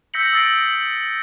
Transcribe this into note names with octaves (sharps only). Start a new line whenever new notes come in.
E6 G6 A#6 B6 C#7 F#7
D#6 E6 A6 A#6 C7 D7